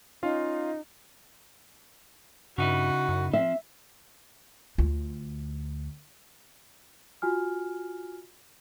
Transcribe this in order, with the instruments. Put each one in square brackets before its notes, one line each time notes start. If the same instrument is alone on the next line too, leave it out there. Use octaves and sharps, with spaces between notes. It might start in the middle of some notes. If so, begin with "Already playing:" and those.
[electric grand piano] C#4 F4 F5 [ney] D#4
[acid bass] G2 [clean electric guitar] C#3 D#4 E4 [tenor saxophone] F#4
[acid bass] F#2
[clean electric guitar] F3 [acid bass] C4 [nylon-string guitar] E5
[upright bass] D2 F4
[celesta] F4 F#4 G#5 F6